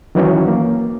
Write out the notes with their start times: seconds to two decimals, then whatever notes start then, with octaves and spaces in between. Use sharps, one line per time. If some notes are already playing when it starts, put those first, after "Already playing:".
0.15 D#3 E3 F#3 C#4
0.48 A#3